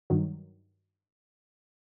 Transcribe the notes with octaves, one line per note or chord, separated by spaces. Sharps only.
G2 D#3 F#3